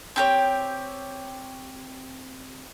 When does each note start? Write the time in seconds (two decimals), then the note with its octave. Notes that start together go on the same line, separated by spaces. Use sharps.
0.16 C4 G4 C#5